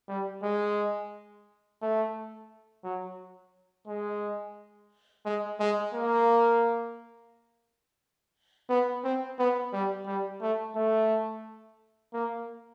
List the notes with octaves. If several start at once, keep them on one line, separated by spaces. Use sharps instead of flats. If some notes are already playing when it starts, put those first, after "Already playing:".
G3
G#3
A3
F#3
G#3
G#3
G#3
A#3
B3
C4
B3
G3
G3
A3
A3
A#3